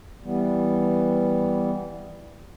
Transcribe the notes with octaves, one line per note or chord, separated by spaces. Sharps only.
E3 G3 B3